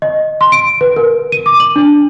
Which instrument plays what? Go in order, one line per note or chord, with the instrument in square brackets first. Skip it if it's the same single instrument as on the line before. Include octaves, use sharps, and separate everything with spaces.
[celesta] D#5
C6
D7
B4
A#4
D#7
D6
F#7
D4